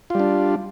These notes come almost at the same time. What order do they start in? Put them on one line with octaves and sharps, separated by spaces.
F4 G3 D4